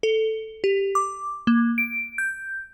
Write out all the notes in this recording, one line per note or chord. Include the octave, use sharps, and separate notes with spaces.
A4
G4
D6
A#3
D7
G6